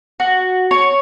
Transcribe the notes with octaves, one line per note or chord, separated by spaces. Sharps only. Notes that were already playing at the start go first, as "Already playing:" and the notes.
F#4
C#5